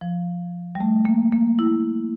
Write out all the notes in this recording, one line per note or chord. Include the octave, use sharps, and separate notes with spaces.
F3
G3
A3
A#3
A#3
E4